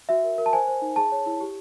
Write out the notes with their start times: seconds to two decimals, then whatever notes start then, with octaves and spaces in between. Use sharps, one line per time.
0.09 F#4 E5
0.24 A#4
0.38 A#4
0.46 A5
0.53 C5 G#5
0.67 C5
0.82 D#4
0.96 G#4 A5
1.12 C#5
1.26 E4
1.40 G4